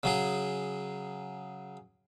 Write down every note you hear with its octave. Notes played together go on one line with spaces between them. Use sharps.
C#3 F#3 G#4